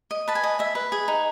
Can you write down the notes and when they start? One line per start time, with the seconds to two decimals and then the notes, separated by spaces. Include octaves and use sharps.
0.11 D#5
0.28 B4 A5
0.35 G#5
0.43 D#5
0.59 D#5 E5
0.75 B4
0.92 G#4
1.08 D#4